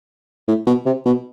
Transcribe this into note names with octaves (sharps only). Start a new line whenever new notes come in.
A2
B2
C3
B2